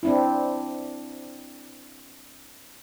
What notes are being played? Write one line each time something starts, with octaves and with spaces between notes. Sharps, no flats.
C4 D4 E4